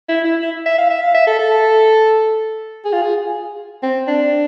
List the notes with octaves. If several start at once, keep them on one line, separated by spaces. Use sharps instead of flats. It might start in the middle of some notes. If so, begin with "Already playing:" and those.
E4
E4
E4
E5
F5
E5
F5
E5
A4
A4
G#4
F4
G#4
C4
D4